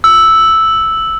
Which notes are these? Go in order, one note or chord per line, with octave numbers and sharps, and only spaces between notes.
E6